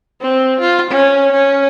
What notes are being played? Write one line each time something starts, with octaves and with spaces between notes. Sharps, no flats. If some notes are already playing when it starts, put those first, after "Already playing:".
C4
F4
C#4
C#4